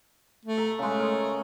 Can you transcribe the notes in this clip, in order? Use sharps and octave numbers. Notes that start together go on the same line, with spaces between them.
A3
E5 A#5
C#3 G#3 A3
A#4 C#5 D#5